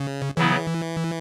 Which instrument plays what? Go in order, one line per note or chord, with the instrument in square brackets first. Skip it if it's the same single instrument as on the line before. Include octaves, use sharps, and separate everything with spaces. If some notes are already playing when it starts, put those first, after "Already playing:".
Already playing: [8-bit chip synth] C#3
[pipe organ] C#3 F#3 B3 E4 [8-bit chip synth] E3